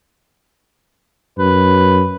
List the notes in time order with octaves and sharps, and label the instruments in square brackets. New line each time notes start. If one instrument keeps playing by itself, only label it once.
[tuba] F#2 [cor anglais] B4